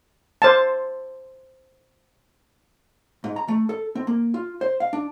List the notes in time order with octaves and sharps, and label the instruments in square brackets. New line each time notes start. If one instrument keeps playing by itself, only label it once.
[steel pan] C5 A5
[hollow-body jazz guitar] G#2
A#5
A3
A4
C4
A#3
F4
C5
F5
D4